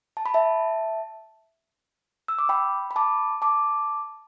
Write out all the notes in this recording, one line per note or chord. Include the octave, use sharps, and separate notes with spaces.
A5
B5
E5 A5
E6
D6
G5 B5
B5
A5 D6
A5 D6